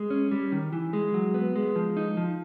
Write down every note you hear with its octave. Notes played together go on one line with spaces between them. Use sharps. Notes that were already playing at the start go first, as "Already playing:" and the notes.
Already playing: G#3
C#4
G3
D#3
E3
G#3
F#3
B3
G#3
F3
D#4
F3